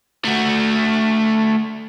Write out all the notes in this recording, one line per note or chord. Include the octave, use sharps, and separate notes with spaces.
A3 F#4